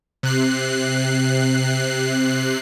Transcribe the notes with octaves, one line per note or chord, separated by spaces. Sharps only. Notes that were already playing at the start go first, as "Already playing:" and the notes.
C3 F#6 C7